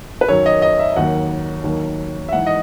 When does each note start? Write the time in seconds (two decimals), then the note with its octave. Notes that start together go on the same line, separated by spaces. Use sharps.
0.21 B4
0.28 F#2 D#3 F#3 C#5
0.46 D#5
0.62 D#5
0.79 E5
0.96 D#2 D#3 F#3 F#5
1.64 D#2 D#3 F#3
2.29 E5
2.32 G#2 E3 F#5
2.47 D#5